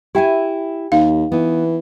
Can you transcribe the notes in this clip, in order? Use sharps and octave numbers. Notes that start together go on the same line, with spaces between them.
E4 G4 E5 G5 G#5
D#2 D#4 F5
E3 B3